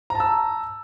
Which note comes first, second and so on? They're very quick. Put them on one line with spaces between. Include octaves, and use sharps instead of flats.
A#5 A5 E6